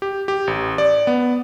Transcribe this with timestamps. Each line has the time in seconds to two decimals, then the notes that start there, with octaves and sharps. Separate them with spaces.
0.02 G4
0.28 G4
0.47 A1
0.78 D5
1.07 B3